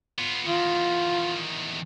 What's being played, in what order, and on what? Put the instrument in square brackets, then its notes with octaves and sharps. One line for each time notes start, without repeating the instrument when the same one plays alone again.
[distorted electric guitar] B3 F4
[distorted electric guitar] E2 D#3 [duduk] F4